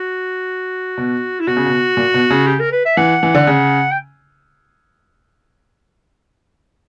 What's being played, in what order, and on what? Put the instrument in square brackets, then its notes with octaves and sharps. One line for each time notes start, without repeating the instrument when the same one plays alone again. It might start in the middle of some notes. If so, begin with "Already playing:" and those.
Already playing: [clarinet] F#4
[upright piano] B2
[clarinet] E4
[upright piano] B2 [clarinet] F#4
[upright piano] C#3
B2
A#2
B2
C#3
[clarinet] G4
A#4
B4
E5
[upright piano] E3 [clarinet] F#5
[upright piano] E3
D3
C#3
[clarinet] G5